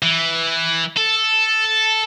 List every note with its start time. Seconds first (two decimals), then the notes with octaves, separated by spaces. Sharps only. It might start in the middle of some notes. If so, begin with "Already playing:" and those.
0.03 E3
0.97 A4